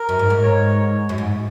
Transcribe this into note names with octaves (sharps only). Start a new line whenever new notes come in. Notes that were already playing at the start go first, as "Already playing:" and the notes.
Already playing: A#4
F#2
G#2
G#2
C#5
F#2
G#2